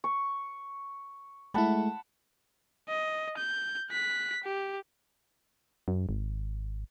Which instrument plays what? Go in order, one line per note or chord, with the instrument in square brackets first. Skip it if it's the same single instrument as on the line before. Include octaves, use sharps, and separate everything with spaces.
[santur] C#6
[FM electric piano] G#3 A3 E4 [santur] F#5 A5 B5
[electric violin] D#5
G6
F#6 B6
G4
[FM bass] F#2
G#1